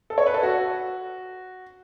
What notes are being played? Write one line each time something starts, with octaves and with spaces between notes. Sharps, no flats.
A4
C#5
B4
A4
F#4